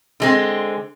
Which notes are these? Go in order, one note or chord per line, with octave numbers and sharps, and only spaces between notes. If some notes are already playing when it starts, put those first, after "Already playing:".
D3 G#3 C4